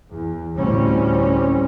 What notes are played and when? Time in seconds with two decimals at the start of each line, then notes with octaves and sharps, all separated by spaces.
0.11 E2
0.57 D2 A2 G3 C4 C#4